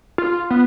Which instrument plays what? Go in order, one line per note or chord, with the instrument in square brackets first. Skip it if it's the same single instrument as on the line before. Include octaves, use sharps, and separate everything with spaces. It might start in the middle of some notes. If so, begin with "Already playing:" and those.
[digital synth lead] F4
B3